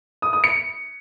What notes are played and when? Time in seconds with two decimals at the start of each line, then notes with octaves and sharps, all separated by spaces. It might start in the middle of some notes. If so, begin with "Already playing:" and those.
0.22 D#6
0.33 D#6
0.44 C#7